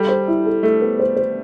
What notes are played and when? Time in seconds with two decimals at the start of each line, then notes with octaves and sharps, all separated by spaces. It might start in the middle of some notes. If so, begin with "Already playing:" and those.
Already playing: G3 A4
0.09 C5
0.28 E4
0.46 A4
0.63 A3 A4
0.81 B3
0.99 C5
1.16 C5